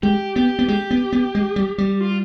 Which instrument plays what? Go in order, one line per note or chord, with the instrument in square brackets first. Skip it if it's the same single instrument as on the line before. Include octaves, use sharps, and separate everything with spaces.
[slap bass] G#3 [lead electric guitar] G4
[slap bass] B3 [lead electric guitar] G4
[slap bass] B3
[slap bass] G#3 [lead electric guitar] G4
[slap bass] B3
B3
G#3
G3
G3
[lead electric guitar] F4